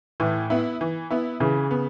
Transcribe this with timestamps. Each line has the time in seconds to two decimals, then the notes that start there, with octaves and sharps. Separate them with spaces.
0.20 A2 E3
0.50 B3 E4
0.81 E3
1.11 B3 E4
1.40 C#3 E3
1.71 B3